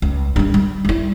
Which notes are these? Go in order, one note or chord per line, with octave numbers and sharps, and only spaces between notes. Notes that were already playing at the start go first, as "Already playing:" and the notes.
C#2
G2 D#3
G3
G3 E4